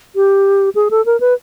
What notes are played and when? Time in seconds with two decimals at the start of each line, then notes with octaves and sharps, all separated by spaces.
0.16 G4
0.75 G#4
0.91 A4
1.06 A#4
1.20 B4